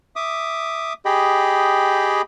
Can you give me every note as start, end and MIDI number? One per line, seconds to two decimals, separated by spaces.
0.16 0.93 76
0.16 0.93 86
0.16 0.93 87
1.05 2.22 67
1.05 2.22 68
1.05 2.22 75
1.05 2.22 79
1.05 2.22 83